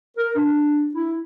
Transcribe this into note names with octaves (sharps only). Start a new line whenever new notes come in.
A#4
D4
E4